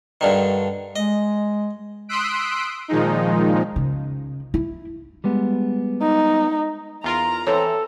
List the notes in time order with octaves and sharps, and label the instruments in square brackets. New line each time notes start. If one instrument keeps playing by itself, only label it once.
[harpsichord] G2 D3 D#3
[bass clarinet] G#3 [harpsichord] D#5
[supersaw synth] C6 D#6 E6 F#6 B6 D7
A#2 D#3 F3 G#3 D#4
[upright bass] C#3
E4
[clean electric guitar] G3 G#3 B3
[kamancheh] D#4
[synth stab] E2 F4 A#4 [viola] A#5
[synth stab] E3 C4 [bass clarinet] A4 [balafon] C#5